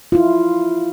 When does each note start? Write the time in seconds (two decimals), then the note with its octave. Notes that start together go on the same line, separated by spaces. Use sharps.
0.12 E4 F4